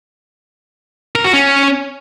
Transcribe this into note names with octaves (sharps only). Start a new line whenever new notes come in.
A#4
F#4
C#4